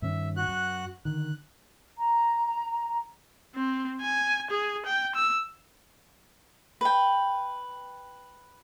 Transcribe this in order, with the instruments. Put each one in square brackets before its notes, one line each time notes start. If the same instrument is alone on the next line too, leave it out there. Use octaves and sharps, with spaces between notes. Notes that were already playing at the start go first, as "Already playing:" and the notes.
[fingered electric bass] G2 D#3 C#4 [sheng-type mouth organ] E5
[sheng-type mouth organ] F#4 F#6
[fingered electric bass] F#2
[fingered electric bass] D3 D#3 [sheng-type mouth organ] F#6
[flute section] A#5
[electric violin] C4
G#5
G#4
G5
E6
[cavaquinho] B4 G5